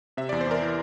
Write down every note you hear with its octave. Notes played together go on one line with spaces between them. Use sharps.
C3 E5
E2 D5
C5
E2 A#4 D5
E3